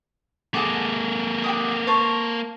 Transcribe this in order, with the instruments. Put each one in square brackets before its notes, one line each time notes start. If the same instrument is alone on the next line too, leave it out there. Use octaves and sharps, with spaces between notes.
[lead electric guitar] A#3 A4 [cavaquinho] G#4 F#5 D6
[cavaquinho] G4 F#5 D#6
C5 A5 C#6